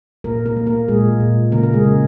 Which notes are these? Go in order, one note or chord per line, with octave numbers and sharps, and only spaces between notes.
A#2 A#3 A#4
A#3 A#4
A#3
A#3 A#4
A#2 G#3 G#4
A#2
C#3 A#3 A#4
A#4
G#3 G#4
C#3